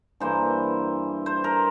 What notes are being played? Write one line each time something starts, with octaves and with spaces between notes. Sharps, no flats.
G2 E3 A#3 E4 C5
C5
A#4